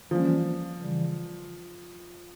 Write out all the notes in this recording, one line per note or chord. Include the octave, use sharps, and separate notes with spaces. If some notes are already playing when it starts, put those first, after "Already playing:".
E3 F3 G3 A#3 C#4
C#3 E3 G3